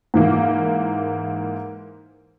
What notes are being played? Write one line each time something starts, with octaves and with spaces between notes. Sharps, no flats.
G#2 E3 A#3